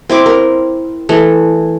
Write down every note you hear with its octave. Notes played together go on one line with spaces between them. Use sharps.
C4 E4 D6
A#4
E3 A3